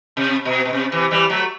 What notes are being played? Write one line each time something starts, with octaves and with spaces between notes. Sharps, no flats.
C3
B2
B2
C3
C3 E3
E3 G3
F#3 A3